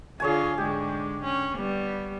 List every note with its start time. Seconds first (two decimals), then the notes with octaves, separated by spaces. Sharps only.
0.20 D3 F4 G#4 C#5 G#5
0.58 G#2 D3 G#3 G4
1.24 C#4
1.57 G3 B3